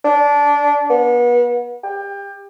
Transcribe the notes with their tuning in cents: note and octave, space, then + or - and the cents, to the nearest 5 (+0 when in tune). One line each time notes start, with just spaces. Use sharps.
D4 -20
B3 -35
G4 +30